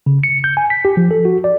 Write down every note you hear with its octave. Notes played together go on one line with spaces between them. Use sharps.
C#3
C#7
G6
G#5
B6
G4
F3
A4
F#4
D5